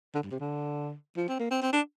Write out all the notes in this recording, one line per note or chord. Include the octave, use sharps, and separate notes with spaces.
D3
G2
C3
D3
F3
C4
A#3
C4
C4
D4